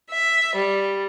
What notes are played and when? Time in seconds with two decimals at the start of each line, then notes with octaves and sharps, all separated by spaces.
0.10 E5
0.55 G3